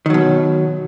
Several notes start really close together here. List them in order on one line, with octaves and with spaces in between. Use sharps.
D#3 F#3 B2